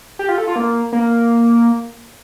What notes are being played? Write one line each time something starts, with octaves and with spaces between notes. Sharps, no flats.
G4
F4
A4
F4
A#3
A#3